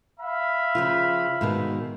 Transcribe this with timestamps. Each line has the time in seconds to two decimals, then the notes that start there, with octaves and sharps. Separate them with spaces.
0.20 E5 F5 B5
0.75 C#3 F3 F4
1.41 G#2 B2 D#3